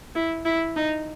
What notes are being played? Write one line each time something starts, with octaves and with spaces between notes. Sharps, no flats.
E4
E4
D#4